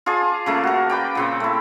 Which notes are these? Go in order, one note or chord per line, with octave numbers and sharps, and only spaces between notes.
F4 G#4 D5 A5
C#3 A3 A#3
F#4 A#4
B4 D5 G5
A#2 C#3 C4
A3 E4